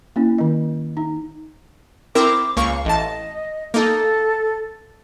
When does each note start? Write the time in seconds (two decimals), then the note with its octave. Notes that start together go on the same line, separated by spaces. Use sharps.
0.16 A#3 C#4 E4
0.38 D#3 D#5
0.97 D#4
2.15 C4 E4 A#4 D6
2.57 C#2 A#3 F5 C#6
2.85 A1 D#5 A5
3.74 A#3 D#4 A4